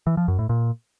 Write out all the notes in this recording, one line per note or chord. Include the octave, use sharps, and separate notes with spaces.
E3
F3
F#2
A2
A#2